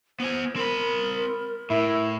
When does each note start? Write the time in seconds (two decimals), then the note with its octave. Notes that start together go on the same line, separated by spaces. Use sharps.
0.20 B3 C5 G#5
0.56 C4 A#4 B5
1.70 A2 E4